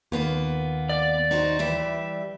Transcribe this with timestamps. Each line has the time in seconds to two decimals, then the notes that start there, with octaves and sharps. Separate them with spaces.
0.12 D#2 A#3 B3 F4
0.89 D5
1.31 D#4 F#4 C5
1.59 E3 G3 E5